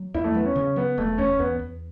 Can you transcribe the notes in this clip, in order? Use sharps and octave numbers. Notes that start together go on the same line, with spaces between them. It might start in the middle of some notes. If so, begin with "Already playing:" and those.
Already playing: F#3
E2 E4
A3
F#3 B3
C#4
C#3
F#3 B3
E1 A3
E2 C#4
E2 B3
E2